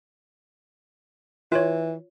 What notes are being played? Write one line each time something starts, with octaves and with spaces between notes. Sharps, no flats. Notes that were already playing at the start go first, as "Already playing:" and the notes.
E3 F4 C#5